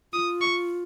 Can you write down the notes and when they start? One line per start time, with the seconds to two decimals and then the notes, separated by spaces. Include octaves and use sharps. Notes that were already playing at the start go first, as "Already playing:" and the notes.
0.13 F4 D#6
0.41 C#6